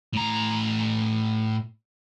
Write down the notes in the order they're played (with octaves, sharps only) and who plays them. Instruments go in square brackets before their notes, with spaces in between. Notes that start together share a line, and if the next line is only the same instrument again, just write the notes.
[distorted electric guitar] A2 A#5